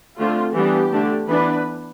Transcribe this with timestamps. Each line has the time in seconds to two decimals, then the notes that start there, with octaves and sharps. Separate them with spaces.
0.18 D3 A3 C4 F4
0.55 E3 G3 B3 D4 G4
0.92 D3 A3 D4
1.29 E3 B3 D4 B4